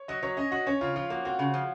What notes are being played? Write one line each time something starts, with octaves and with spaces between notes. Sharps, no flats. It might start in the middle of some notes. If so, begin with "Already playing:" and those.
Already playing: C#5
F#3 D#5
F#3 C#5
C#4 D#5
F#4 D#5
C#4 C#5
C#3 F4
F3 F4
A#3 F#4
C4 F#4
C#3
F3